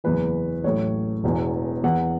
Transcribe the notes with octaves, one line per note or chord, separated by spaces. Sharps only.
F#1 E2 E3 B4
A1 A2 F#3 C#5
E1 E2 E3
E2 E3 F#5